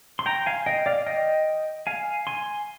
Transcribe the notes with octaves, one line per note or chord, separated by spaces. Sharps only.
C6
G5 A#5
F5 G#5
D#5 G5
D5 F5
D#5 G5
F5 G#5
G#5 C6